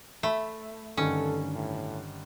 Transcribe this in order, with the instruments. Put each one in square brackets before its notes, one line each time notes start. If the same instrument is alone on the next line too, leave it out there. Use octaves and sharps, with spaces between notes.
[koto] A3 [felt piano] E5 B5
[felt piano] G2 D3 D#3 [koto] C#4 [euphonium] A4
[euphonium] A2